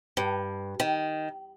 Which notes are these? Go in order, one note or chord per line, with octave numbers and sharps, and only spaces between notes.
G2
D#3